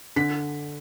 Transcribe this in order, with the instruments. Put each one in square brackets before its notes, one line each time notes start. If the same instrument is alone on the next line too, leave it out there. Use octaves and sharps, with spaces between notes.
[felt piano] D3 B6